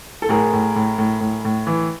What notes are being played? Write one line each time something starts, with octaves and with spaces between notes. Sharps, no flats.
A4
A2 G#4 A#4
A2
A2
A2
A2
A2
E3